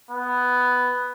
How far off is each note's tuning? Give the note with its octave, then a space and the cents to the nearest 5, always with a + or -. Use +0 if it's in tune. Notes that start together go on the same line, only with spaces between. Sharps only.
B3 +5